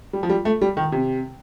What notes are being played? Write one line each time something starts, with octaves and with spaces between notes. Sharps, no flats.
G3
F3
G3
A3
G3
D#3
C3